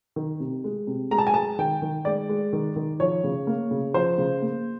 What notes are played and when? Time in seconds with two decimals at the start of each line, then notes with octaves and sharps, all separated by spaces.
0.16 D#3
0.40 C3
0.64 G#3
0.87 C3
1.11 G#3 A#5
1.18 A5
1.27 G#5
1.34 G#3 A5
1.58 D#3 G5
1.82 D#3
2.05 G#3 D5
2.29 G#3
2.53 D#3
2.76 D#3
3.00 F3 C#5
3.24 C#3
3.47 A#3
3.71 C#3
3.94 F3 C5
4.18 C#3
4.42 A#3